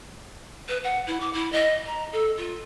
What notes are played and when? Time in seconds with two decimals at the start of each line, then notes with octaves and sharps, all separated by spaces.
0.68 B4
0.84 F#5
1.07 E4
1.20 D6
1.33 E4
1.52 D#5
1.86 A#5
2.12 A4
2.37 F4